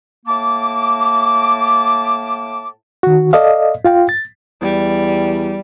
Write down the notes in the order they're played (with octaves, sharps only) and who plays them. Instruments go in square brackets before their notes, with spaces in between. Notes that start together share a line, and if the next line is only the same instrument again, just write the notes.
[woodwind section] A2 A#3 A5 D6
[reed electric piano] D#3 F#4
A4 D5 D#5 F5
F4 F5 G5
A6
[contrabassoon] E2 [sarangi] G3